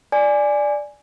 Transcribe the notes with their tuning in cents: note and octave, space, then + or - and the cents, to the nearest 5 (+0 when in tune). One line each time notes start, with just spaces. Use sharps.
D5 +0 G#5 +0